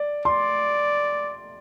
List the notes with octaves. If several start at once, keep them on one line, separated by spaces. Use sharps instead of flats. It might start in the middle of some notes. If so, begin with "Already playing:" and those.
Already playing: D5
D5 C6